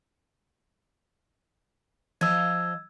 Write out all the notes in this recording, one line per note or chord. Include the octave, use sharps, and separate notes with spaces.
F3 D#5 F5 E6 G#6